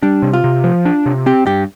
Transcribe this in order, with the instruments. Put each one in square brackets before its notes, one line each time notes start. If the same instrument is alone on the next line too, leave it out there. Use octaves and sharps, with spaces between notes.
[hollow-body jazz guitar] G3 [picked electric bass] D4
[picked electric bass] C3
[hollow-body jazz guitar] F4
[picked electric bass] C3
F3
D4
C3
[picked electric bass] C4 [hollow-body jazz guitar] G4
[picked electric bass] G2 [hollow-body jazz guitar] G4